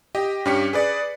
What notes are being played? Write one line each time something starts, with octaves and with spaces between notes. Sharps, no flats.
G4 D#5
G2 C#4 G4 B6 C#7
G#4 B4 D5